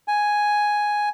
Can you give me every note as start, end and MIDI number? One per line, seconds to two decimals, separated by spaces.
0.08 1.09 80